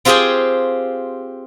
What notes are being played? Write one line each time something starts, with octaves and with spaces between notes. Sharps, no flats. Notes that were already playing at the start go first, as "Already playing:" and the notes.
C4 F4 G4 G#4 G5 G#5